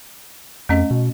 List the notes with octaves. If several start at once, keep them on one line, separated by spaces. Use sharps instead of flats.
F2 A3 C#4 D#5
B2